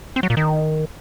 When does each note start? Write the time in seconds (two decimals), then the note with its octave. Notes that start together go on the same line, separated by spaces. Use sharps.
0.16 C4
0.23 F#3
0.30 A#2
0.37 D#3